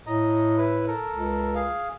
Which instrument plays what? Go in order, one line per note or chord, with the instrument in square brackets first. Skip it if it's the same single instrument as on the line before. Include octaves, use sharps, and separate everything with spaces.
[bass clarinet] A2 [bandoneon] D#5 A#5
[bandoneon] E4 B4
A4 A#4
[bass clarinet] C#2
[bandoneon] G#4 F5